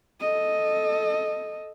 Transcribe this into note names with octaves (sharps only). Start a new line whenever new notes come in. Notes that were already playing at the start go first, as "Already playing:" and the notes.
A4 D#5